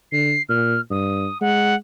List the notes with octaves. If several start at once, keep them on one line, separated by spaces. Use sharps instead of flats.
D3 C7
A#2 F6
G2 D#6
G#3 F#5